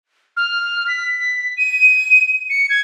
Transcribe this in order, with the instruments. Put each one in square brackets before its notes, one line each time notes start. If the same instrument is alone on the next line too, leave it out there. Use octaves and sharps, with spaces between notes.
[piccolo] F6
B6
D#7
C#7
G#6